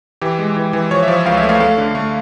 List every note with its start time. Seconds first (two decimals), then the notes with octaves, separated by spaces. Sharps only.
0.21 E3 G4
0.38 G#3
0.56 E3
0.73 E3
0.91 F3 C#5
1.03 E5
1.08 F3
1.14 E5
1.25 C#2 F5
1.37 E5
1.43 A3
1.49 F5
1.60 A3 F5
1.78 D3
1.95 A3